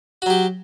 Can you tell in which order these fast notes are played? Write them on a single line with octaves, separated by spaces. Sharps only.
F#4 F#3 G4